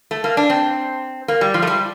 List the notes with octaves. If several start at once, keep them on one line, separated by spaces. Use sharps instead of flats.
A3
A#3
D4
C4
A#3
G3
F3
A3
G3